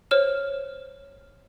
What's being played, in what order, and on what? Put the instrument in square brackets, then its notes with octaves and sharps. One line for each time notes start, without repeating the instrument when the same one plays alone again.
[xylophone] C5 C#5 F6 E7